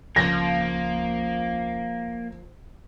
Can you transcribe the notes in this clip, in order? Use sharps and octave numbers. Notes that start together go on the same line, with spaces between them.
C#2 C#3 F3 A#3 A#6